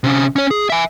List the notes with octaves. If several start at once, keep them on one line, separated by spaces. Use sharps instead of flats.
C3 C#4
C#4 C#5
G#4
E5 G#5